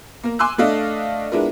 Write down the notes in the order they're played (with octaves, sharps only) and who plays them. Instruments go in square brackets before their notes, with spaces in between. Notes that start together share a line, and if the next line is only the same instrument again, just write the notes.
[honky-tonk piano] A#3 A#4
G#5 C6 D6 E6 F#6
A3 D4 A4 D5 D#5 F5
G#3 B3 D4 E4 F4 A#4